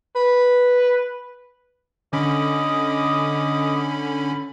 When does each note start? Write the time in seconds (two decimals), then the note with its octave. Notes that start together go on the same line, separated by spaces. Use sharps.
0.16 B4
2.13 D3 C#4 D#5 B5 D6 D#6